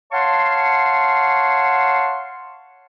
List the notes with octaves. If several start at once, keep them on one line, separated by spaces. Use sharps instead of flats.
C#5 F5 F#5 A5 C6 C#6